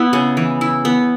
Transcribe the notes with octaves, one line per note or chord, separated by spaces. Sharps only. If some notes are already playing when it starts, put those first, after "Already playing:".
Already playing: B3 E4
C#3
E3
E4
B3